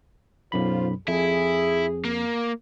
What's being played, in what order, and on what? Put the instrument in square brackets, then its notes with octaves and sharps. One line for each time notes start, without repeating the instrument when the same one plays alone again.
[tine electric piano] B1 F#2 B5 [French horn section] F4 C5
[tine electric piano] F2 [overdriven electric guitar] E4 [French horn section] G#4
[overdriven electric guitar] A#3